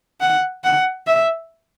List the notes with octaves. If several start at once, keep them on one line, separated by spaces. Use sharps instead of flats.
F#5
F#5
E5